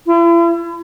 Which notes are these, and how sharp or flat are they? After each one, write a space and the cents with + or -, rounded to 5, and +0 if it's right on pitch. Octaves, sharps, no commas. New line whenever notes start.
E4 +40